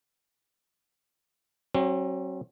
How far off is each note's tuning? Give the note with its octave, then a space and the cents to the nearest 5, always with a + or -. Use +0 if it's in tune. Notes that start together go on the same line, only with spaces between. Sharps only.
F#3 +20 C4 +45